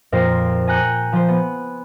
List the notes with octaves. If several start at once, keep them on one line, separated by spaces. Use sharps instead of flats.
F2 A#2 A#4 C5 C7
G#5 A#5 F#6 G6 C#7
F3 C5
B3